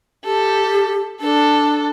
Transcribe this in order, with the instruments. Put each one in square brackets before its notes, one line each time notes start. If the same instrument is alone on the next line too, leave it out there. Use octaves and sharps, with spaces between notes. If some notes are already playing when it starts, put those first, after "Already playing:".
[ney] G4 [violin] A4
[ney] D4 [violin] A4